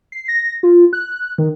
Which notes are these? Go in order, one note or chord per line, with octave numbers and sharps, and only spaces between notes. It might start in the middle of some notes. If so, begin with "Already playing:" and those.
C7
A#6
F4
F#6
D#3